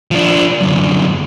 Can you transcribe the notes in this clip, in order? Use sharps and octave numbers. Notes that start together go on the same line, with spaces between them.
F3 D4
F#2 D3